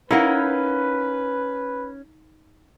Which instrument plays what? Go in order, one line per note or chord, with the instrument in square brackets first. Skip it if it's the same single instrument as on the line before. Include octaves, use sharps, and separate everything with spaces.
[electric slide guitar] C#4 [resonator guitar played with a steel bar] D#4 F5 F#5 [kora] E4 A#4 [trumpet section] B4